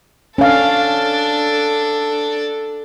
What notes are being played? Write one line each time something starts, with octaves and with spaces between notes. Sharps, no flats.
C#4 D4 A4 F5